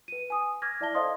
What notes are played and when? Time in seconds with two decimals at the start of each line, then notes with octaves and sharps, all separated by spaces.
0.08 B4 D#7
0.30 G#5 D#6
0.62 D6 F6 G#6 A#6
0.81 E4 D5 E5 A5 A#6 G7
0.94 A4 C5 D#5 F5 C6 D#6